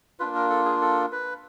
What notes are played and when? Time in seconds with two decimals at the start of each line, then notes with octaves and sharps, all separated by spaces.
0.20 A#3 D4 F4 B4
0.35 A#4
0.50 A4
0.65 G#4
0.81 A4
1.12 B4